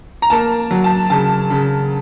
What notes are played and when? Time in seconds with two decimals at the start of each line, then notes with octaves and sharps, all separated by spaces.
0.22 A#5
0.30 A#3 A5
0.71 F#3
0.84 A5
1.10 C#3 A5
1.50 C#3